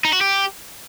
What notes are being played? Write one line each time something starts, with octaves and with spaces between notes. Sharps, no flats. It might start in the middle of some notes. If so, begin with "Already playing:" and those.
D#4
F#4
G4